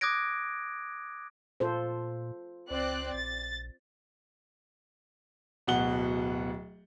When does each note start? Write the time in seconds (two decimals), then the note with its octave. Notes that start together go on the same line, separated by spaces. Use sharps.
0.01 D6 D#6 F#6 G#6 A#6 D7
1.60 A#2 F4 A4 C5
2.71 C#2 C4 D5 F#6
3.14 A#1 A6
5.67 D1 B2 F#5 G7